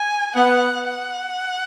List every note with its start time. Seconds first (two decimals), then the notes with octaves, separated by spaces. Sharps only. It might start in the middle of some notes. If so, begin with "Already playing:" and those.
Already playing: G#5
0.35 B3 F#5
0.88 F#5